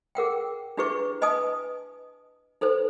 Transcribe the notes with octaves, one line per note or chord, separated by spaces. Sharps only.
G#4 A#4 F#5 G5
D4 E4 G4 G#4 B4 C#6
B4 D#5 G#5 A5 D#6
D#4 A4 B4 C5